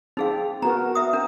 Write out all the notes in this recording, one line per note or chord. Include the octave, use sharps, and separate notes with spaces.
C4 D#4 G#4 F5
B3 F#4 A#4 A#5
E5 D#6
D4 A#4